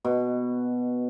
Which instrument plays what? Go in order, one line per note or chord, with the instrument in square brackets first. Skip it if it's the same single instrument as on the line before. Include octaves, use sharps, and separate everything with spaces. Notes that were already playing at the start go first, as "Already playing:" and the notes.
[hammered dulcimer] B2